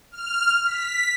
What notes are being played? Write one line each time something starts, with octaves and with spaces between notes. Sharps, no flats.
F6
B6